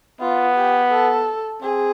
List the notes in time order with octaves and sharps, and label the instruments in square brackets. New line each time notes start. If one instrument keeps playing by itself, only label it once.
[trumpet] B3 [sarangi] F4
[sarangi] G4
A4
[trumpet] C4 [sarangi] G#4